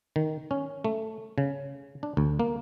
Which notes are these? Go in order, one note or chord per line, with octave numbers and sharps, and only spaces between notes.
D#3
C#4
A3
C#3
D4
D2
A#3